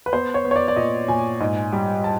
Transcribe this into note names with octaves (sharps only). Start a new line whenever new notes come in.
B4
B3 C5
C#5
B3
C#5
D5
D5
A#2 D#5
A#2 G#5
G#2
G3
A5